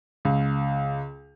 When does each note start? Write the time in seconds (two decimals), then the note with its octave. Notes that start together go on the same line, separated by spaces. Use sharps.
0.25 C#2